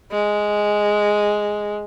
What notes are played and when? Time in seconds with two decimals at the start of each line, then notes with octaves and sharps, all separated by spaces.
0.12 G#3